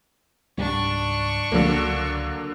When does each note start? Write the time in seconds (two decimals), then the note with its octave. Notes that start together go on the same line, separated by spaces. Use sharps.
0.58 C#2 G#2 G3 D4 C#6
1.52 C#2 D3 F#3 A#3